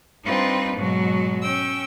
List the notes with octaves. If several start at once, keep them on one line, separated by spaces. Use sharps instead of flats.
G3 C4 D4 D#4 F4 B4
G#2 B2 F#3 G#3
C#4 G5 E6